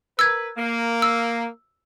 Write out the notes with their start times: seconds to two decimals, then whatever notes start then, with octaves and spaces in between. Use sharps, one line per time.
0.19 A#4 B4 E6 G#6
0.57 A#3
1.02 E6